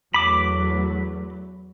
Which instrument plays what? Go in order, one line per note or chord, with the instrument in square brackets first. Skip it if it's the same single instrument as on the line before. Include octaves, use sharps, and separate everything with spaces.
[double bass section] E2 F#3 A3 [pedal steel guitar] B5 D6